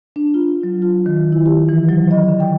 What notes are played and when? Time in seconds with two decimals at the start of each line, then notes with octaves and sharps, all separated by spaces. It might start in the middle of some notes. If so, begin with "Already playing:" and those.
0.16 D4
0.34 F4
0.63 F#3
0.82 F4
1.06 D#3
1.32 E4
1.46 G4
1.69 E3
1.89 F#3
2.11 D#5
2.28 D3
2.40 G5